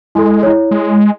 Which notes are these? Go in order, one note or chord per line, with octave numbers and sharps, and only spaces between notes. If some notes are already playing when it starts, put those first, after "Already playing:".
G#3 E4 A4
E4 C#5
G#3